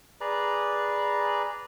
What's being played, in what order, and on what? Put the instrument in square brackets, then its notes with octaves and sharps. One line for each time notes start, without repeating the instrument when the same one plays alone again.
[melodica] G#4 B4 D5 A#5